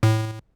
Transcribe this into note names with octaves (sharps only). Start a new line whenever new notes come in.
A2